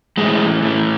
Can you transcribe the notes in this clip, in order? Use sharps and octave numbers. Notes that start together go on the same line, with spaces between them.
A2 E3 G#3
A2 E3